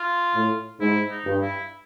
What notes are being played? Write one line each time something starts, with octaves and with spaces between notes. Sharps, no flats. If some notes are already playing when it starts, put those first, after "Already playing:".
Already playing: F4
A2
G#2 E4
D#4
G2
E4